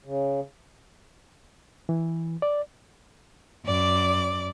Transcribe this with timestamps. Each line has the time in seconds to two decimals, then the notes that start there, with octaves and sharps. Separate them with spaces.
0.05 C#3
1.89 E3
2.42 D5
3.63 F#2 D5 D6